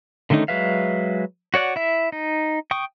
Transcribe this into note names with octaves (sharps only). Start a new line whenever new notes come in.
D3 D#3 A3 C#4 D#4
F#3 G#3 B4 E5 F5
F#4 C#5 D5 F#5
E4 E5
D#4
G5 C#6 D#6